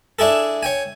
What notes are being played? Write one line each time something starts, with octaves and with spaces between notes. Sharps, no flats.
D4 E4 G#4 A4
C#5 G5 G#5